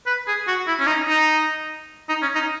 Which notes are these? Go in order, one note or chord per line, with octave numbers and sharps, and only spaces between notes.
B4
G#4
F#4
E4
C#4
D#4
D#4
D#4
C#4
D#4